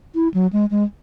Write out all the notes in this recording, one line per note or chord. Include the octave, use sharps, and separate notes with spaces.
E4
F#3
G#3
G#3